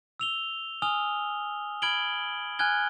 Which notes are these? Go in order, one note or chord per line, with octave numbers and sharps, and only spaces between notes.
E6 F7 G7
G#5 D#6 F6 F7 G7
B5 F6 G#6 D7 F#7 G7
G#5 F6 F#6 G#6 G7